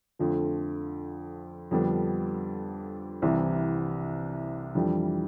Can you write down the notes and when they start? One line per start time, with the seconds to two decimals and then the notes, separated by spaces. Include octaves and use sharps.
0.19 F2 D3 F3 A3
1.71 F2 D3 G3 B3 D4
3.22 C2 C3 E3
4.75 F2 E3 G3 D4